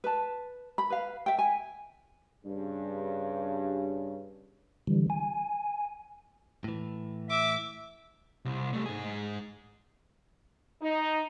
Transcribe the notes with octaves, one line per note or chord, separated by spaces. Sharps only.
B4 A5
B5
B4 F5
E5 G5
G#5
G2 C#3
D3 E3 G3
G#5
A2 E3
E5 D6
C2
G3 A3
G#2 G#4
D#4